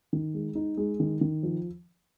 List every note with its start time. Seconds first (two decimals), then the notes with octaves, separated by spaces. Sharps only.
0.13 D#3
0.34 G#3
0.55 D#4
0.77 G#3
1.00 D#3
1.21 D#3
1.43 F3